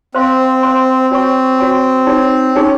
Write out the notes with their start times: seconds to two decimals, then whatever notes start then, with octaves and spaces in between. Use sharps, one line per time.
0.15 C4 C5 F5 C6
0.63 C5 F5 C6
1.10 C4 F#4 C#5 G#5 C#6
1.58 F#4 C#5 G#5 C#6
2.07 D#4 G#4 C#5
2.55 C#4 D#4 G#4 C#5